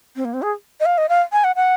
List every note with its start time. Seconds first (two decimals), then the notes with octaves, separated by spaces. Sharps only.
0.16 C4
0.25 A#3
0.34 C4
0.42 G#4
0.80 D#5
0.86 F5
0.98 D#5
1.09 F5
1.32 G#5
1.44 F#5
1.56 F#5